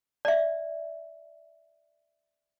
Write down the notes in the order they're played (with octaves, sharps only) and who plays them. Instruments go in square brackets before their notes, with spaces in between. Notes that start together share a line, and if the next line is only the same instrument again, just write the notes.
[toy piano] D5 E5